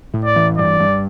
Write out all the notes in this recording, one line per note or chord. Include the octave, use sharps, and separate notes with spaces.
A2
D5
E3
G2 D5
G2